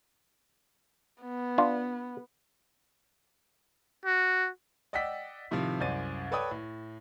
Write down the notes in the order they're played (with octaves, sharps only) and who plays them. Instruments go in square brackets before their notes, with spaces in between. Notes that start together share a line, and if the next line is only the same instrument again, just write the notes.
[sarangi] B3
[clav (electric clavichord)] D4 F4
[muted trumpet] F#4
[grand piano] D5 D#5 F#5 G5 E6 B6
A2 C3 D#3 F3
C2 F#2 C5 D5 A6 D#7
A4 B4 C#5 D5 G5 D#6
A2